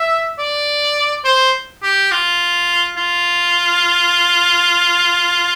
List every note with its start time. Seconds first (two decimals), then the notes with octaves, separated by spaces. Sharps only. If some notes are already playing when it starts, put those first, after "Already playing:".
Already playing: E5
0.39 D5
1.25 C5
1.83 G4
2.11 F4
2.97 F4